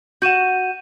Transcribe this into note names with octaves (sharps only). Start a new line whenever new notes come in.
F#4 F#5 G6 D#7 E7